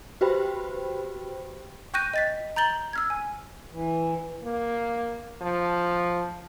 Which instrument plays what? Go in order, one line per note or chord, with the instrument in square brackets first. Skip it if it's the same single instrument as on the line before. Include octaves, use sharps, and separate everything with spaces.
[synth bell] F#4 G4 B4 C5 G5 B5
[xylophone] G5 C#6 F#6 G6 A#6 D#7
D#5 A6 B6
A#5 G6 A6 F#7 G7
E6 F6 G#6
G#5
[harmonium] E3
[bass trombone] A#3
F3